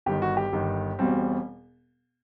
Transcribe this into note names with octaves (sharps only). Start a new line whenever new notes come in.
G1 G2 D#3 G4
F#4
G4
G1 G2 D#3
E1 E2 B2 G3 C4